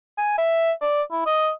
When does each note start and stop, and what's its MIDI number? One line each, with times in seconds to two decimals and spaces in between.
0.18 0.36 80
0.38 0.72 76
0.82 1.02 74
1.12 1.22 64
1.26 1.50 75